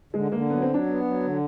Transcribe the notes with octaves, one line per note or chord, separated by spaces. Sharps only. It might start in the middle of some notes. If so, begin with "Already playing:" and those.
D3 G#3
D3 A#3
F#3 B3
C4
F#3
D4
B3
F#3
D3